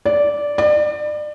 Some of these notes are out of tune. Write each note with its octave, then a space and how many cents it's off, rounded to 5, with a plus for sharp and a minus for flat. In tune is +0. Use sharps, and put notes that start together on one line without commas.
D5 -10
D5 +30